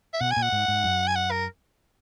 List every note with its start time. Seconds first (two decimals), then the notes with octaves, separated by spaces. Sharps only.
0.14 E5
0.21 B2 F#5
0.31 G#5
0.37 A#2
0.42 F#5
0.52 G#2
0.68 G#2
0.84 F#2
1.08 G#5
1.16 F#5
1.31 A#4